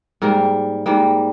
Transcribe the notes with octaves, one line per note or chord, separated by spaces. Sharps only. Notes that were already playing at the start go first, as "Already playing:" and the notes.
G#2 G3 A#3 A#4
G#2 G3 A#3